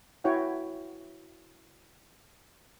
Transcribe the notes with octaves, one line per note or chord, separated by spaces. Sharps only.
E4 F#4 C#5 F#5 G5